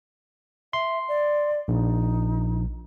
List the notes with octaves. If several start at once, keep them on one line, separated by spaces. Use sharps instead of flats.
E5 C6
D5
A#1 D#4